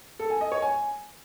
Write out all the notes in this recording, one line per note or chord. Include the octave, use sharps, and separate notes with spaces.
A4
G#5
D#5
C#5
G#5